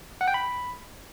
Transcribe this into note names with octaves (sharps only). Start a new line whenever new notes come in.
F#5
G5
B5